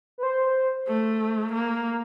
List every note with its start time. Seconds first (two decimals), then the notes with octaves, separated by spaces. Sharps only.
0.18 B4
0.23 C5
0.88 A3
1.53 A#3